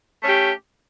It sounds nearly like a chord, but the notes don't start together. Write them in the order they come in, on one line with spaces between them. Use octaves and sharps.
A3 C#4 G4